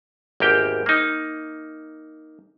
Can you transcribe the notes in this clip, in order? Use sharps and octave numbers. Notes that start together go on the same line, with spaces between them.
G#1 E2 A#3 G4 G5
A#3 D#4